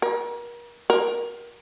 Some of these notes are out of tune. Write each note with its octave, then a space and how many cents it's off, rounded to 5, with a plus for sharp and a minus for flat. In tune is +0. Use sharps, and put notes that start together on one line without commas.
A#4 +40
A#4 +25